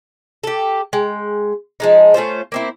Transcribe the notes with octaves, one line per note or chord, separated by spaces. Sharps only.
G4 A4
G#3 G5
F3 G#3 D#4
A3 C#4 F4 C5
A#3 C4 E4